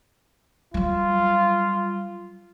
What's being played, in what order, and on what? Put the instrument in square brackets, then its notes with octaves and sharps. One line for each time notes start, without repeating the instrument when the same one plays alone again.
[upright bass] F#3 G3 [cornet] F4